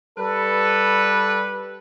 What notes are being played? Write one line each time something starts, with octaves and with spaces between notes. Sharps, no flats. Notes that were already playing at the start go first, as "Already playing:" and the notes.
G3 A4 B4